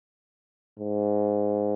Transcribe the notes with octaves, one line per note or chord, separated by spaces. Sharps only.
G#2